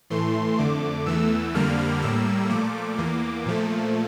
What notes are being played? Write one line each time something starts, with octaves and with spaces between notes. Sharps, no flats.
A2 E3 A3 C6
F2 D3 A3 D6
E2 E3 A3 E6
F2 D3 G3 A#3 F6
A2 G3 A#3 E6
A#2 F3 A3 D6
E2 E3 A#3
A#2 F3 A3